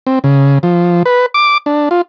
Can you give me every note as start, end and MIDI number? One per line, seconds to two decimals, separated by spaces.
0.07 0.19 60
0.24 0.59 49
0.63 1.03 53
1.06 1.26 71
1.34 1.58 86
1.66 1.89 62
1.91 2.01 65